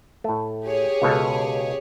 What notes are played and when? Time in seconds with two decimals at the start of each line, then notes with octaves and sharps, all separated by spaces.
0.24 A2 A3
0.65 G4 G#4 C#5
1.02 C#2 B2 A4